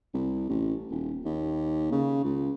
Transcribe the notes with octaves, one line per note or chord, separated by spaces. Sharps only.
C2
A1
D#1
D#2
C#3
C#2